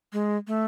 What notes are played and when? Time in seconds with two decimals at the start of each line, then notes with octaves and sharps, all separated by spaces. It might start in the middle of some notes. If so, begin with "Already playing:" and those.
0.13 G#3
0.47 A3